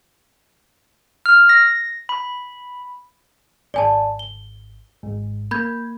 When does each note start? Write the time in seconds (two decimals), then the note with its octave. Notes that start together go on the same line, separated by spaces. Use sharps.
1.26 F6
1.49 A#6
2.09 B5
3.74 G#1 D5 G#5 A5
4.19 G7
5.03 G#1 G#2
5.51 A#3 B5 G6 G#6